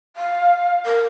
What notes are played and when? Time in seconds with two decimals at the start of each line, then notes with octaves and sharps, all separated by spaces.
0.16 F5
0.85 A#4